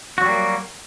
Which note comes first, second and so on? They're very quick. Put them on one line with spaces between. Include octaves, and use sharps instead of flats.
F#4 F#3 G3 A#3